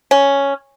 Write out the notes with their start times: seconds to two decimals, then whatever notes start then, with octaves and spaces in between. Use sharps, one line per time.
0.11 C#4